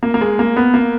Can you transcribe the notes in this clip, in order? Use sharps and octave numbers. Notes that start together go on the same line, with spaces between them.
A#3
A#3
G#3
A#3
B3
A#3